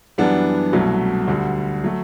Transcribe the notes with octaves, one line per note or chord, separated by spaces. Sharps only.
F#2 E3 G3 B3 D4
C2 B2 F#3 A3
D2 D3 G3
F#3 A3